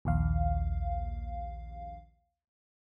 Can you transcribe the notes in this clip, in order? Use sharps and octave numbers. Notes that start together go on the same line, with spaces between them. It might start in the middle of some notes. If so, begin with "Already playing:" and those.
A#1 D#2 F5